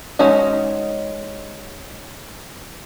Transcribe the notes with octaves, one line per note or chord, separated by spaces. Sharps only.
G#3 C#4 D#4 F#4